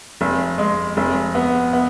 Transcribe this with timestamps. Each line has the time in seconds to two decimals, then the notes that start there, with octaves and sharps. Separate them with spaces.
0.21 F1
0.58 G#3
0.97 F1
1.35 B3
1.73 B3